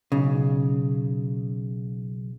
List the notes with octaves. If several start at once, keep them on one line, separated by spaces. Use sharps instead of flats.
B1 C#3